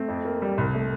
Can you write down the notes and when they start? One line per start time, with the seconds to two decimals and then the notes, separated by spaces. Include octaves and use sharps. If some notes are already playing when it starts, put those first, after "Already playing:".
Already playing: A3 C4
0.08 F2
0.25 A#3
0.42 G3
0.58 C2
0.74 A3